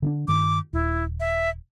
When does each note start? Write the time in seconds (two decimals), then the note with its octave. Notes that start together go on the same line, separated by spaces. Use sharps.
0.02 D3 C#4 D4
0.28 G2 D#3 D6
0.73 D#1 E4
1.20 E5